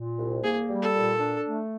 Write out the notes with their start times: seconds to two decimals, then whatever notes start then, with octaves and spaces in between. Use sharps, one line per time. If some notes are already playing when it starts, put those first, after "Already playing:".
Already playing: A#2
0.18 C2
0.44 A#3 G#4
0.69 G3
0.82 A4
0.94 A#2
1.19 D4
1.45 A3